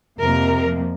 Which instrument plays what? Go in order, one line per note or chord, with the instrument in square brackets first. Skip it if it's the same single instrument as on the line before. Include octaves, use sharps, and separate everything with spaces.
[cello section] F2 C3 F3 A#3 A#4